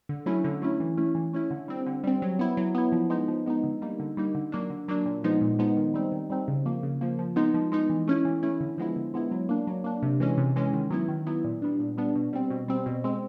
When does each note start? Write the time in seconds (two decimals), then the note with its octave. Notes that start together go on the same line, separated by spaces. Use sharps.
0.09 D3
0.26 F#3 A3 C#4 E4
0.44 D3
0.62 F#3 A3 C#4 E4
0.80 E3
0.97 A3 C#4 E4
1.15 E3
1.33 A3 C#4 E4
1.51 D3
1.68 G3 C4
1.86 D3
2.04 G3 C4
2.22 F#3
2.39 B3 E4
2.57 F#3
2.75 B3 E4
2.92 F3
3.10 G#3 B3 D#4
3.28 F3
3.46 G#3 B3 D#4
3.64 D3
3.82 G3 A#3 D#4
4.00 D3
4.17 G3 A#3 D#4
4.35 D3
4.52 F#3 A#3 D4
4.70 D3
4.88 F#3 A#3 D4
5.05 A#2
5.24 F3 G#3 B3 D#4
5.41 A#2
5.59 F3 G#3 B3 D#4
5.77 D#3
5.94 G3 C4 D#4
6.12 D#3
6.30 G3 C4 D#4
6.48 C#3
6.65 F3 A#3
6.83 C#3
7.01 F3 A#3
7.19 F3
7.36 G#3 B3 D#4
7.54 F3
7.72 G#3 B3 D#4
7.90 E3
8.08 A3 C#4 E4
8.25 E3
8.43 A3 C#4 E4
8.61 D3
8.78 F3 G#3 B3 E4
8.96 D3
9.14 F3 G#3 B3 E4
9.31 F#3
9.49 A#3 D4
9.67 F#3
9.84 A#3 D4
10.03 C3
10.20 E3 G#3 C#4
10.37 C3
10.56 E3 G#3 C#4
10.73 D#3
10.91 F#3 B3 E4
11.08 D#3
11.27 F#3 B3 E4
11.44 A#2
11.62 G3 B3 D4
11.79 A#2
11.98 G3 B3 D4
12.16 B2
12.33 G3 C4
12.50 B2
12.68 G3 C4
12.86 B2
13.04 G#3 C4